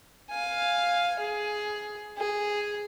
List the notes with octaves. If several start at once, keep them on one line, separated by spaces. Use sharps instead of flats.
F5 G#5
G#4
G#4